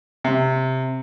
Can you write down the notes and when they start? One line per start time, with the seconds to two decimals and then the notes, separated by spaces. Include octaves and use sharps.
0.24 C3